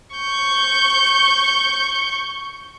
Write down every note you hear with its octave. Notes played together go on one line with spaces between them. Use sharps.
C#6 G6